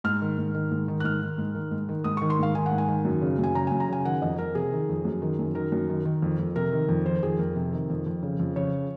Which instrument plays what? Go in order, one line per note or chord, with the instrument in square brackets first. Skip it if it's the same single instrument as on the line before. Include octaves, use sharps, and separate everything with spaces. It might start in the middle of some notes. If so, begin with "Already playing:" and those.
[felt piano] G#2 F6
D#3
G#2
D#3
G#2
D#3
F#6
G#2 F6
D#3
G#2
D#3
G#2
D#3
G#2 D#6
D#3 C#6
C6
G#2 F5
D#3 G#5
F#5
G#2
G#5
D#3
F#2
C#3
F#2 G#5
C#3 A#5
F#2 G#5
A#5
C#3 G#5
D#3 F#5
F2 D#5
F2 A#4
C3 G#4
D#3
F2
F#2
D#3
F#2
D#3 A#4
F#2
D#3
D#3
F2
F2
C3 A#4
D#3
F2
D#3 C5
F2 G#4
F2 A#4
C3
D#3
F2
F2
C#3
F2
C#3 C#5